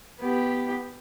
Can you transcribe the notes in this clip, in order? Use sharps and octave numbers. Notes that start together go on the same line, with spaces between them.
B3 G4